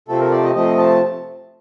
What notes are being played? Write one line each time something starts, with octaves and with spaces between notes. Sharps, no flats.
C3 F3 A3 C4 A4
A#4
D5
D#5
C3 F3 A3 C4 D#5
A5